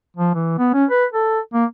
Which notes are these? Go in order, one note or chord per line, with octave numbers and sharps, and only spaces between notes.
F3
E3
B3
C#4
B4
A4
A#3